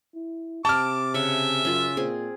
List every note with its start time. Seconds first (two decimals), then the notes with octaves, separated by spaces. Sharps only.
0.15 E4
0.65 C3 G5 A5 D6 F6
1.14 C#3 E5 F#5
1.65 F#2 C#4 F4
1.97 A#2 C4 G#4